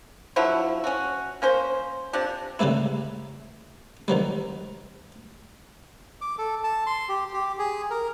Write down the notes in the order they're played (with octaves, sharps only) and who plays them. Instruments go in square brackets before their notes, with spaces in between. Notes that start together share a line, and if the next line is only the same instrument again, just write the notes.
[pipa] D3 F3 F#3 E4
C#4 F#4
A#3 C#4 C5
C3 F3 D4
[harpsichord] C#3 G3 A3 A#3 E4
C2 D#3 F#3 G3
[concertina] D6
A4
A5
C6
G4
G4
G#4
A#4